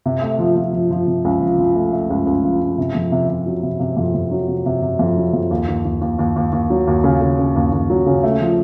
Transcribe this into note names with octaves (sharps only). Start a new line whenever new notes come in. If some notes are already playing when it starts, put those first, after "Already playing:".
C3
A3
F3
F3
F3
F3
C3
C#2
F3
F3
A3
A3
C#2
C#2
F3
C#2
C3
F2
C3
C3
F#3
C3
C3
F2
F2
F#3
C3
C3
C3
F2
F#3
F2
D#2
D#2
D#2
D#2
D#2
D#2
D#2
F#3
D#2
C#3
C#3
C#3
D#2
D#2
F#3
C#3
A3
F3